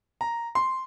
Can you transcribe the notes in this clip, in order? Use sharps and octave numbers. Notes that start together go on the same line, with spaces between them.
A#5
C6